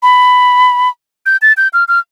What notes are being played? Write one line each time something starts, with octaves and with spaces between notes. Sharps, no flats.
B5
G6
A6
G6
F6
F6